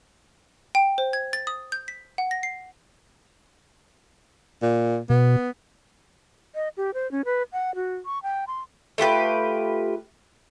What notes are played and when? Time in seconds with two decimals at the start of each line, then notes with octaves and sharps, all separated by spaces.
0.75 G5
0.98 C5
1.13 G#6
1.33 A6
1.47 D#6
1.72 G6
1.88 B6
2.18 F#5
2.31 A#6
2.43 C7
4.62 A#2
5.10 B2 B3
6.55 D#5
6.77 G4
6.94 C5
7.11 C#4
7.25 B4
7.52 F#5
7.75 F#4
8.05 C#6
8.23 G5
8.47 C6
8.98 A3 F4 G4 B4